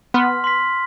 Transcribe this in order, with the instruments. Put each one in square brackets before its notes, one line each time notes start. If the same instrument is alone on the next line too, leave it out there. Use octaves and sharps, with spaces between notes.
[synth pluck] B3 [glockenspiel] C6 F6 B6
[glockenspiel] C6 F6 B6